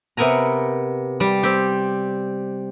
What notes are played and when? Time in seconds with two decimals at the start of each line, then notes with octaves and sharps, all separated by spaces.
0.17 C3 B3 A#4 G#5 A#5
1.20 G3
1.43 C4 G4